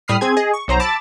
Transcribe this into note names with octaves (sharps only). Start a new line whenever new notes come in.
A2 G3 B5 D#6 F6 C7
C4 G#4 G#6
G#4 D#5
C#6
B1 F#3 C5 A#5
A5 B5 D6 E6 A6